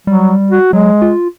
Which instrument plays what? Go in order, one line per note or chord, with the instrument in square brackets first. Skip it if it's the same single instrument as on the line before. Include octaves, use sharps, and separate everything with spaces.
[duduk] F#3 [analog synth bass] G3
[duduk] F#4
[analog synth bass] F#3 [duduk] G#3
[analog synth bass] F4